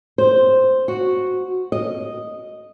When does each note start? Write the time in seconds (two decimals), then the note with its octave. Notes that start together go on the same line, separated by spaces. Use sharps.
0.18 C5
0.88 F#4
1.72 D#5